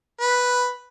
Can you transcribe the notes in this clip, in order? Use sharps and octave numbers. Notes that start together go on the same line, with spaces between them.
B4